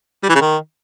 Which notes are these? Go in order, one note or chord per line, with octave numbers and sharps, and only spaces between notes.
G3
E3
C#3
D#3